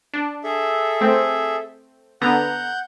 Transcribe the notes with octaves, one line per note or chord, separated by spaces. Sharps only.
D4
G#4 A4 E5
A3 C4
D3 B3 F#5 A#5 G6